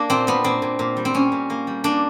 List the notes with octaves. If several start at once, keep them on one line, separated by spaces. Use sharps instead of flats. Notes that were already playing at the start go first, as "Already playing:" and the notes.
Already playing: A#3 D4
A#2 C4
A#2 B3
A#2 C4
A#2
A#2
G3
C4
A#2 C#4
A#2
A#3
G3
A#3 D4